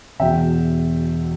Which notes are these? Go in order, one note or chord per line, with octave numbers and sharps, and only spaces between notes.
E1 E2 B2 E5 G5